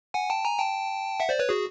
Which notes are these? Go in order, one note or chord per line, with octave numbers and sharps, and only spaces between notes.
F#5 G#5
G5 A5
G#5 A#5
G5 A5
E5 F#5
C5 D5
B4 C#5
F#4 G#4